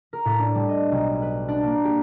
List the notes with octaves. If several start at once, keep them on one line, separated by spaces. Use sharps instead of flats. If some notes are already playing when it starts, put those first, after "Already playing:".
A#4
A2
D4
G3
D#5
B1
B4
D4
A#3
G4